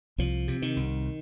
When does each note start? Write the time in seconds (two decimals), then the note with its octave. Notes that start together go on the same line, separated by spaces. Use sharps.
0.18 C2 F3
0.48 C3
0.62 D#3
0.76 C2